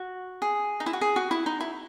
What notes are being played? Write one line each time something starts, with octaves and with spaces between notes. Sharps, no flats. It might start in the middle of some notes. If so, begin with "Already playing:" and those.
Already playing: F#4
G#4
D#4
E4
F#4
G#4
F#4
E4
D#4
E4